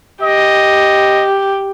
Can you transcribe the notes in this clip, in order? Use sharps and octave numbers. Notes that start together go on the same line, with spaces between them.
G4 D#5